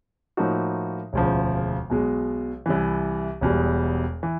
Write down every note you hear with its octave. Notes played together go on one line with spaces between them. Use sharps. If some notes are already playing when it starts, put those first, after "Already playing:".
A2 F3 A#3 D#4 F#4
E1 D2 C#3 F3
B1 B2 G#3
C2 C3 E3
E1 E2 B2 G3
E3